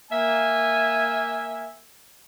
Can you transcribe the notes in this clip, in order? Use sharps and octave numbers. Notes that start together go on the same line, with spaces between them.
A#3 E5 G#5